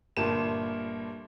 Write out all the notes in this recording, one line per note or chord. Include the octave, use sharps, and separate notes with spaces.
G1 A#2 G3 A#4 A5 E7